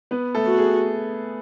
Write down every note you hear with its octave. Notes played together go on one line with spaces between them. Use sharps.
B3 B4
A3 A4
F#4
G#4